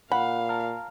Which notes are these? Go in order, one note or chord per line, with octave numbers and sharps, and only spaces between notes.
A#2 F5 F#5 B5
A5 A#5 F6